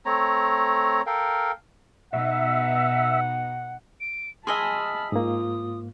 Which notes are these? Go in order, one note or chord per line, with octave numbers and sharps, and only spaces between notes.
A3 C4 C#5 A#5
A4 A#4 F5 G5
B2 D#4 E5 F#5
D7
G#4 D#5 E5 G#5 A5 B5 C6 F6
G#2 A#3 F4 D#6